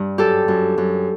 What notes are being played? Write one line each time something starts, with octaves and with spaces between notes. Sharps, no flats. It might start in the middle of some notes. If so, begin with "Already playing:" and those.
Already playing: G2
F#2 G4 A4
F#2
F#2